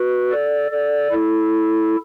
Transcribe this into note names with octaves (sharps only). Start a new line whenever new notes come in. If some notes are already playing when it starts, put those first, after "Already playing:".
Already playing: F#4 B4
A4 D5
A4 D5
E4 A4